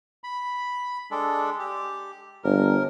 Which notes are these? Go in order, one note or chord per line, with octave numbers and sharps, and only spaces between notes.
B5
G#3 D4 A4
G4
G1 A#4